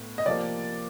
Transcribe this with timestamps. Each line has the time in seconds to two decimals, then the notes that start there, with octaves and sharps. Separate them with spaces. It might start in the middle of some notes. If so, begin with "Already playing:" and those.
Already playing: A2 B3
0.18 D#5
0.26 C3 F3 A#3 D5